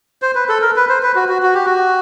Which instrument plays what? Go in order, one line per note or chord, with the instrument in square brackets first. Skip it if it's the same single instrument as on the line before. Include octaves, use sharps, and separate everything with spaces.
[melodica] C5
B4
A4
A#4
B4
C5
B4
F#4
F#4
F#4
G4
F#4